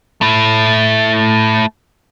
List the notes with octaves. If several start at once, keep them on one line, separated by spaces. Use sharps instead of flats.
A3 E4